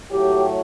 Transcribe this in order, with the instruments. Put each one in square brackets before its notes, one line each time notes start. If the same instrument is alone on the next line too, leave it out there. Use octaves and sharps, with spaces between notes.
[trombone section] A2 F#3 A3 G4